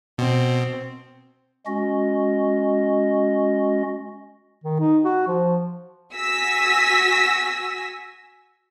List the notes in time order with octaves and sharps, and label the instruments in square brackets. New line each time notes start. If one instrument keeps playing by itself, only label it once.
[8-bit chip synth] B2 [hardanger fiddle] C4
[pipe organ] G#3 C#4 F#4 D#5
[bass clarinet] D#3
D#4
F#4
F3
[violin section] F#4 G#5 E6 A#6 B6